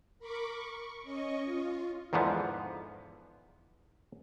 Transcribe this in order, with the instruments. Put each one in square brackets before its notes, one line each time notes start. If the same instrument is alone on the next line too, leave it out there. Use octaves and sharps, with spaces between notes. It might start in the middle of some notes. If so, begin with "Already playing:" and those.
[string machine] A#4 B5 C#6 D6
C#6
C#4 D#5 C#6
F4
[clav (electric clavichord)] E2 G#2 D3 F3 B3